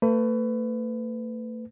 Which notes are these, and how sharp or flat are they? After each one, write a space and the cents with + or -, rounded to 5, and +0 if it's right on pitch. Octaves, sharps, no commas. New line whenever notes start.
A3 +40 B4 +25